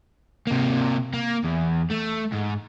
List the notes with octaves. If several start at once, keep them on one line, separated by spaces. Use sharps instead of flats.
C3 A#3
A#3
E2
A3
G#2